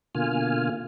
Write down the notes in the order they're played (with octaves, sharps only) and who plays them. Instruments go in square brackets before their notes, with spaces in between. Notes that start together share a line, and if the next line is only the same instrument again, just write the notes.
[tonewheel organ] B2 D3 A#3 F4 G#5 F6